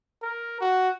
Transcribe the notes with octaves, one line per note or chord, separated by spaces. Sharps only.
A#4
F#4